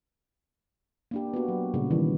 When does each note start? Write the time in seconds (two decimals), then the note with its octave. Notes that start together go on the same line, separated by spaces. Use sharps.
1.11 A#3 D4 G4
1.34 B3 F#4
1.48 F#3
1.74 A#2 C#3 G3
1.91 D#3 E3 G3